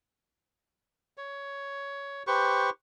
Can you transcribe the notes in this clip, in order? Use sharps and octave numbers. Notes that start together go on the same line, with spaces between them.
C#5
G4 B4 C5 C#6